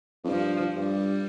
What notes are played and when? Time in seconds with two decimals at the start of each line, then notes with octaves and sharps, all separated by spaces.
0.24 F2
0.29 G2 F3
0.75 G2 G3